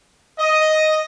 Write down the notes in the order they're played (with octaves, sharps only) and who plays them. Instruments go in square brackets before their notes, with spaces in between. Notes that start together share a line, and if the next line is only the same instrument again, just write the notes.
[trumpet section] D#5